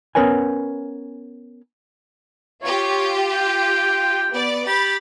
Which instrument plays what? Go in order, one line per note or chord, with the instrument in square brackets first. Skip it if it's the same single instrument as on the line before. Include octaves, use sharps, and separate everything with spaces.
[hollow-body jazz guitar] B3 C#4 A#4 B4 C#5 G#5
[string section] F4 G4 [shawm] C#5
[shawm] G5
[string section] B3 D5
[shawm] G4 [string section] B5 A6